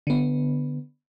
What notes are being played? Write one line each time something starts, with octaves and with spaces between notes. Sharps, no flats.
D3 B3